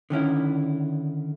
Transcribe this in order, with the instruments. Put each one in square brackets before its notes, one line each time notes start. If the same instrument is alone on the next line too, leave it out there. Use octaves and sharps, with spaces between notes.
[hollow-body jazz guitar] D3 D#3 C#4 E4